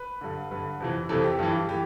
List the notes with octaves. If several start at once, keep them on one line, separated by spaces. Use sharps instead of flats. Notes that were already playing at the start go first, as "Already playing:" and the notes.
Already playing: B4
G2 D3
G2 D3 B4
F2 C3 E3
F2 C3 E3 A4
G4
G2 E3
E3 G4